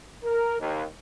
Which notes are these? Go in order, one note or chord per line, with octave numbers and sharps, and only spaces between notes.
A#4
D#2